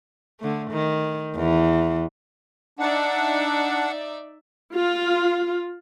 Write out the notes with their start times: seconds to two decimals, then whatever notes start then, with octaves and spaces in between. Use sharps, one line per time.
0.40 D3 A3
0.71 D#3
1.35 E2 E3
2.79 D4 D#4 D5 E5 F#5
4.73 F4